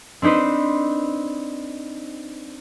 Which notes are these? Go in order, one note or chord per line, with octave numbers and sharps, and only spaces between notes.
C4 D4 D#4 B4 C5